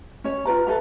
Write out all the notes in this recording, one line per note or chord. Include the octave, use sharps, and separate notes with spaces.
C#4 C#5
F4 A#4 B4 A#5
A4 B4 E5 A#5